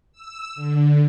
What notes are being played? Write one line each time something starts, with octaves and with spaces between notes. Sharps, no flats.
E6
D3